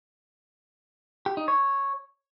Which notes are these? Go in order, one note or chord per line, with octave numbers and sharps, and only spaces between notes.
G4
D#4
C#5